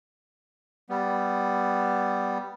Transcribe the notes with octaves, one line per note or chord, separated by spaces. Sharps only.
G3 B3